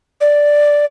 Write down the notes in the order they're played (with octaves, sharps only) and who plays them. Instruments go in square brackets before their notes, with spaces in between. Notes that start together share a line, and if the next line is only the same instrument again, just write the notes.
[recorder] D5